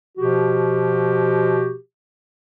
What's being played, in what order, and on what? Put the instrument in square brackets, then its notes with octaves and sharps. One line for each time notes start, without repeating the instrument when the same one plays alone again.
[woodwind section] B2 F3 F#4 G4